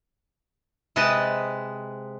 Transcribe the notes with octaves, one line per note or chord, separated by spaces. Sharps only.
C3 G#3 B4 D#5 A5